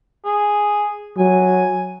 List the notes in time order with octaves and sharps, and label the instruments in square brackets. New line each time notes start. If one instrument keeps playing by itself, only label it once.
[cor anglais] G#4
[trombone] F#3 [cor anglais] G#5